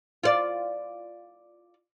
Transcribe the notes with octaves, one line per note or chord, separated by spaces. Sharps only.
F4 D5